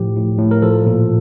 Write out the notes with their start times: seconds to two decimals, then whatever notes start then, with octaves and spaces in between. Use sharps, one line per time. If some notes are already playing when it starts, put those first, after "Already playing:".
Already playing: A2 F3 G4
0.16 A2
0.39 A2
0.51 A#4
0.62 F3 A4
0.86 A#2